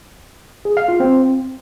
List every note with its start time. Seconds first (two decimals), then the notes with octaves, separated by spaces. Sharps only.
0.65 G#4
0.77 F5
0.88 F4
1.00 C4